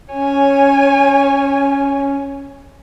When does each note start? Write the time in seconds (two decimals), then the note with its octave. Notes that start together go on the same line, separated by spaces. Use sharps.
0.13 C#4 C#5 G#5